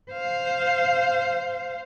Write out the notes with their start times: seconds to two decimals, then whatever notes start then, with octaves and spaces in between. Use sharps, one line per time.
0.11 C5 F5